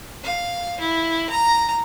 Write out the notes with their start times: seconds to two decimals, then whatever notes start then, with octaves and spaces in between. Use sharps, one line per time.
0.24 F5
0.80 E4
1.30 A#5